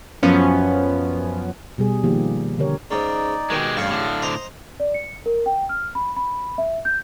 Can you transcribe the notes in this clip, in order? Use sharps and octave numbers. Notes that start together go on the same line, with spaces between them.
F#2 F3 B3 C#4
B2 G3 G#4
D#3 F3 A#3 G4
D3 G4 A#4 C#5
G#2 C#3 D#4 D5
B2 D#3 G#3 G4
A1 G2 G#4 F5 C#6
A2 D3
C5 D#5 A#5
D5
C#7
A#4
G5
F6
B5
B5
E5
G6